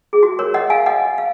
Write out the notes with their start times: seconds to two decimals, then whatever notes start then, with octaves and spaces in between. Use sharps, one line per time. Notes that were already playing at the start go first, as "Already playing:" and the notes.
0.13 G#4
0.23 F#4
0.39 A#4 C#5
0.54 D#5 F#5
0.70 F5 G#5
0.86 D#5 F#5
1.18 F5